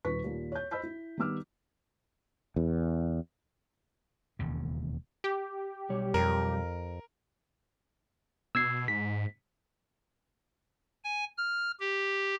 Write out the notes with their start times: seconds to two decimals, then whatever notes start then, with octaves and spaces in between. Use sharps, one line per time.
0.05 D#1 D#4 B4 C#6 B6
0.24 D#2 A#2
0.52 C#5 G6
0.71 C5 D#5 B5 E6 G6 B6
0.83 E4
1.18 D#3 G3 B3 D6 E6 F6
2.56 E2
4.39 E1 D#2 C#3
5.24 G4
5.89 B1 G3 C#5
6.14 F2 A#4
8.55 B2 E6 G#6 C7
8.88 G#2 B6
11.04 G#5
11.37 F6
11.80 G4